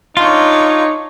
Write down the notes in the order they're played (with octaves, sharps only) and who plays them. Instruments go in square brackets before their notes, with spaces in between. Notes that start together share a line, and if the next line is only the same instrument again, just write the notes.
[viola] D4 C#5 [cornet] D#4 [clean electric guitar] F4